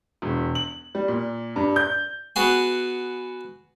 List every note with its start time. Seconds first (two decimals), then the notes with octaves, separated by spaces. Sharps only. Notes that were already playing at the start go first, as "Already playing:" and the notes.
0.22 E1
0.55 F#7
0.95 G3
1.08 A#2
1.56 G2
1.76 G6
2.36 B3 F#4 G#4